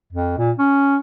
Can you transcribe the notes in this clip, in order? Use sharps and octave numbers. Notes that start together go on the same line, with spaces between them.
F2
A#2
C#4